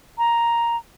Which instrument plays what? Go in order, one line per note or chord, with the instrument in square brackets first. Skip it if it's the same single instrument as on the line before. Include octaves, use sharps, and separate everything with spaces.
[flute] A#5